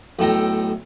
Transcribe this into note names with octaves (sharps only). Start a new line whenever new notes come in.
B1 A2 A4 G5 A#5